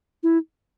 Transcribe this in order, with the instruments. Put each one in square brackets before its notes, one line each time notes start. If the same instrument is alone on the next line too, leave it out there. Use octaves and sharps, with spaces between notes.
[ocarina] E4